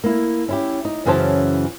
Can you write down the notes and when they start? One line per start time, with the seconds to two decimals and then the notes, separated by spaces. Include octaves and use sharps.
0.04 A#3 E4
0.48 C#4 E4 G4
0.85 D#4
1.06 F#2 C#3 E3 C#4 C5 A5